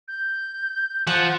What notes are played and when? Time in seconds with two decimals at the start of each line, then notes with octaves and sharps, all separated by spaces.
0.08 G6
1.07 F3 F#5